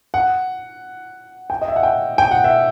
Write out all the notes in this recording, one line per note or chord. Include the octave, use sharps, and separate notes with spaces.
F#5
G5
D#5
E5
F#5
G5
G5
F#5
E5